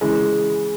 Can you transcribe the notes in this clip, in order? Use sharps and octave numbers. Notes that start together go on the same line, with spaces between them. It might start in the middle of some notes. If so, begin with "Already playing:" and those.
C#3 E3 G#3